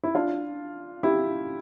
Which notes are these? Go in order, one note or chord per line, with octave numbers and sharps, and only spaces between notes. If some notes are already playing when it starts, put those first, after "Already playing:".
E4
D4 F4
E4 G4